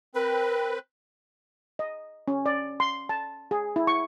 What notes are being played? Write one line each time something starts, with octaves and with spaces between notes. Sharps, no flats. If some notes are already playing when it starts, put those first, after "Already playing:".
C4 A#4 B4
D#5
C#4
D5
C6
A5
G#4
E4
C#6